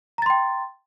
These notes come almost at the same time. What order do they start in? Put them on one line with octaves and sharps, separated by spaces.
A#5 A6 C6 G5